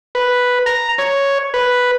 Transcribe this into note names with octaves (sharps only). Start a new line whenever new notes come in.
B4
A#5
C#5
B4